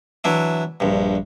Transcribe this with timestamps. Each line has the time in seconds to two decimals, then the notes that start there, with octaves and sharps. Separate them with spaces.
0.24 E3 F#3 D4 E4
0.80 A#1 G2